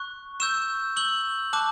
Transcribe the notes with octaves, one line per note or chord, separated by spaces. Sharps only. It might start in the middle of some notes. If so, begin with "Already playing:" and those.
Already playing: C#6 F#6
C#6 E6 G6 E7
C#6 E6 G6 F#7
A5 D6 F#6